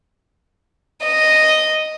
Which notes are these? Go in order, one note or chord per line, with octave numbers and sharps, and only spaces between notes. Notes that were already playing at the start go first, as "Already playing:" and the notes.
D#5